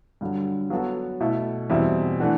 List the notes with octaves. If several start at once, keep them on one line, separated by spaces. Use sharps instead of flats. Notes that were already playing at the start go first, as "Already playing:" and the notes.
G2 D3 F#3
F#3 B3 F#4 A4
B2 A3 E4 A4
E2 B2 G3 C4 E4
E3 A3 D4 F#4